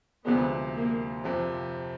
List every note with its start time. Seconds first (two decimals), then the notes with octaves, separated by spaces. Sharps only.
0.25 D2 C3 F3 G#3 B3
0.75 A#3
1.24 F2 C3 F3